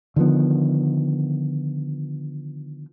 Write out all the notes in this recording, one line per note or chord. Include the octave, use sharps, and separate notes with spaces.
D3 D#3 F3 B3